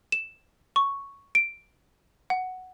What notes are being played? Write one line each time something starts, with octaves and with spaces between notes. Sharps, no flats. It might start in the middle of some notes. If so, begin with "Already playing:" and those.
E7
C#6
D7
F#5